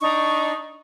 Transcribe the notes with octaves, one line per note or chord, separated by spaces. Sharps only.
D4 D#4 C#6